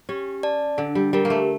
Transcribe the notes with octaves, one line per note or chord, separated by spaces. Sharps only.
C#4 G4
D5 A5
D3 D4
G3
G3 G4 A#4
A#3
A3